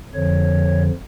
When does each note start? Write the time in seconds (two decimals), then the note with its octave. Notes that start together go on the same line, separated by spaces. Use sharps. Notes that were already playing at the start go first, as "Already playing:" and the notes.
0.14 F2 D3 F3 C#5